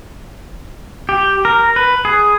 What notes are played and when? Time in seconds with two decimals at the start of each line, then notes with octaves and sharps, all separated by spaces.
1.09 G4
1.45 A#4
1.76 B4
2.05 G#4